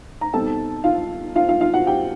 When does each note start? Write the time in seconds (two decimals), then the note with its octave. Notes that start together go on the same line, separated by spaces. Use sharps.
0.21 A#5
0.33 B2 G3 C4 D#4 A4 A5
0.84 F4 F5
1.36 F4 F5
1.48 F4 F5
1.61 F4 F5
1.73 F#4 F#5
1.86 G4 G5